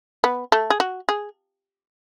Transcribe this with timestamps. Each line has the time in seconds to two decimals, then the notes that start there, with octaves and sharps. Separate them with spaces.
0.24 B3
0.52 A3
0.70 G#4
0.80 F#4
1.09 G#4